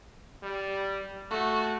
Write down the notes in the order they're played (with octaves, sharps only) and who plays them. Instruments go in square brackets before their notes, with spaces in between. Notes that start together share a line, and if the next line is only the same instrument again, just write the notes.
[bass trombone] G3
[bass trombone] A3 [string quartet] F#4